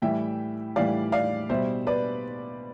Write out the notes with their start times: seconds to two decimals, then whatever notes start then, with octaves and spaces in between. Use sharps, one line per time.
0.02 A2 E3 G3 E5 G5
0.76 A2 E3 G3 D5 F5
1.12 D5 F5
1.49 B2 G3 C5 E5
1.87 B4 D5